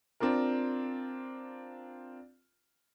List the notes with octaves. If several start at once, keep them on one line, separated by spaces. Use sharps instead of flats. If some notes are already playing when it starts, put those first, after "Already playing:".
C4 D4 F4 A#4